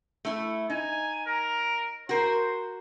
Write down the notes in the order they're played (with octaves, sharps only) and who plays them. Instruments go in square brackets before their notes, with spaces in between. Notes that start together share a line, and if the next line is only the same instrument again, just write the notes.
[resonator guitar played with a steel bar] A3 E4
[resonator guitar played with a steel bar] D#4 [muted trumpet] G#5
[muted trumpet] A#4
[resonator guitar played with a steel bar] F#4 A#4 [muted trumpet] C5